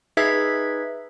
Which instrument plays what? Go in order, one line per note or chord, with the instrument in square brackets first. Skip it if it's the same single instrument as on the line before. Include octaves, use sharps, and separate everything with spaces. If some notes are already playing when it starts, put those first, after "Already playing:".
[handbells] D#4 G#4 B4 E5 G#6 B6